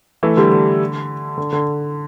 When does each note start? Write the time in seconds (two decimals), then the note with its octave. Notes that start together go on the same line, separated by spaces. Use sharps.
0.23 E3 A3
0.37 D3 G3
0.52 D3
1.37 D3
1.53 D3